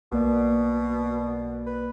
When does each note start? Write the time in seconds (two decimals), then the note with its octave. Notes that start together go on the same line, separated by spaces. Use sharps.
0.12 B1 B2 A#3 D5
1.66 B4